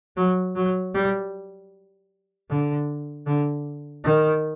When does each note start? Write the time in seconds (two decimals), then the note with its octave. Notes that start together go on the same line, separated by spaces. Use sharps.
0.17 F#3
0.56 F#3
0.94 G3
2.50 D3
3.27 D3
4.04 D#3